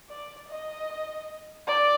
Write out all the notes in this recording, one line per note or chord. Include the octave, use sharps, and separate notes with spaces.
D5
D#5
D5